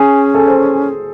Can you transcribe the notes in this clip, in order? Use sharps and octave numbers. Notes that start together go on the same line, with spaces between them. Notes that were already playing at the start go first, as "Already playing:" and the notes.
Already playing: C#4 G#4
A4
C5